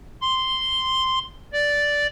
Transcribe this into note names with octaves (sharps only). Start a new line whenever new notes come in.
C6
D5